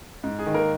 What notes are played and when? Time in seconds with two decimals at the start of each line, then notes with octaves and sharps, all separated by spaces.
0.24 G#2
0.39 G#4
0.46 D#3
0.54 A#3 A#4